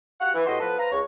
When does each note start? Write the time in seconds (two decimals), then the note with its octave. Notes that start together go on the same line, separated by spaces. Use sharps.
0.20 F#4 G4 F5 F#5
0.34 E3
0.46 A2 B3 F#4 G4 D#5 C6
0.60 F3 B3 A4 B4
0.78 B4 C5 F5 A#5
0.91 C#2 C#5